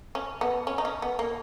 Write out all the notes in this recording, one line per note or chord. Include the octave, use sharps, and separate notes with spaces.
C#4
B3
C#4
D#4
C#4
B3
A#3